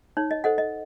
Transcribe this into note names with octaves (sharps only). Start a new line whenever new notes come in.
D#4 C#5
D#5
A4 C5 D#5 F#5
D#5